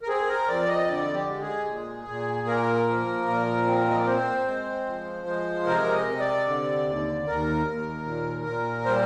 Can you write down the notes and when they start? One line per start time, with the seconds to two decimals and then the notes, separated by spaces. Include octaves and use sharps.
0.02 A#4
0.08 C4 G#4
0.28 A#4
0.47 F2 D5
0.68 D#5
0.87 D3 D5
1.14 G4
1.28 G#3
1.42 G#4
1.67 A#2
2.08 A#2
2.47 A#3 A#4
2.88 F3
3.28 A#2
3.67 C4
3.90 D#5
3.99 D5
4.07 C4 C5
4.47 G#3
4.86 F3
5.27 G#3
5.66 C3 A#4
5.93 D#5
6.06 C3
6.20 D5
6.47 D3
6.87 D#2
7.27 D#2 A#4
7.67 D#2
8.06 A#2
8.47 A#2
8.85 G3 C5